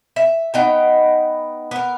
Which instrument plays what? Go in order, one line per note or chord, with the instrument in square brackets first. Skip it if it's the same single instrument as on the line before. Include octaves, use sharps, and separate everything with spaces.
[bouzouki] E5
B3 D#4 G5
B3 A#4